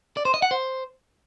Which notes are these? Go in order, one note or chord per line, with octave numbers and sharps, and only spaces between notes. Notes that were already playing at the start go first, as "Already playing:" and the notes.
D5
C5
D#5
F#5
C5